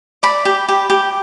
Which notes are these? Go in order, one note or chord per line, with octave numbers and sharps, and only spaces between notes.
D5 B5
G4
G4
G4